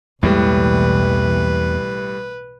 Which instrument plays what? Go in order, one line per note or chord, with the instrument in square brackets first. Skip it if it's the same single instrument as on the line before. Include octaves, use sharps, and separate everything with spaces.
[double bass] B1 E3 [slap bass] E2 G#3 A#3 [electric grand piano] A2 G3 [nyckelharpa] B4